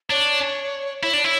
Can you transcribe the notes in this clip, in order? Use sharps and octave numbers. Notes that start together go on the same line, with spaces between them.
D4 C#5
E4 C#5
D4 D5
E4 C#5